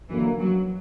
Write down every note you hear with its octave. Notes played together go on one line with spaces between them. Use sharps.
F#2 D3 E3 A#3
F#3